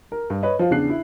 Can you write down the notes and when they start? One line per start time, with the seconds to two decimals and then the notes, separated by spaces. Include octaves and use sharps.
0.12 A#4
0.30 G2
0.43 B4 C#5 D#5
0.59 F3 F4
0.71 E2 C#3 D4 F#6 C7
0.90 E4